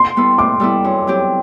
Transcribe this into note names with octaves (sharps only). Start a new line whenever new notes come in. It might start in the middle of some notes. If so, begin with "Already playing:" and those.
Already playing: C6
G3 B3 E4 A4
A2 D6
G3 B3 E4 A4
F#2
F#3 C4 G4